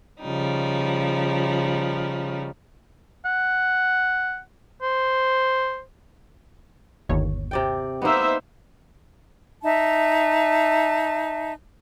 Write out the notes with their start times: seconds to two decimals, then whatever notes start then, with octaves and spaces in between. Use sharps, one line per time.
0.22 C#3 F3 G3 D#4
3.25 F#5
4.82 C5
7.09 G1 D#2 C#5
7.51 C3 D5 G5
8.02 A#3 B3 D#4 C5 E5
9.64 D#4 E5 A5